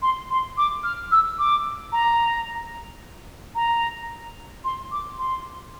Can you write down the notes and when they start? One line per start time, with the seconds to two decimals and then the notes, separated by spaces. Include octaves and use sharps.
0.02 C6
0.30 C6
0.58 D6
0.84 F6
1.12 E6
1.39 D6
1.92 A#5
3.55 A#5
4.64 C6
4.92 D6
5.19 C6